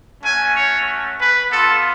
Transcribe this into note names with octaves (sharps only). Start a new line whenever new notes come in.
A3 C#4 F#4 G#5
C#5
B4
B3 F4 A4